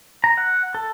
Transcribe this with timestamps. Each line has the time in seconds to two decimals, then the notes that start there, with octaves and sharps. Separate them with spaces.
0.24 A#5
0.37 F#5
0.75 A4